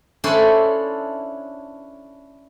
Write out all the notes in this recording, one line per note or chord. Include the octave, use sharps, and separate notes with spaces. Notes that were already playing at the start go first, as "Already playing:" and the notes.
C#4 D4 E4 A4 C5 C#5